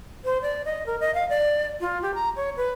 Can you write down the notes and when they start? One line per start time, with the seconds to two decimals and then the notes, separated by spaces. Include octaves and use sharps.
0.25 C5
0.42 D5
0.65 D#5
0.86 A#4
1.00 D#5
1.15 F5
1.29 D5
1.81 F4
2.02 G4
2.15 A#5
2.36 C#5
2.57 B4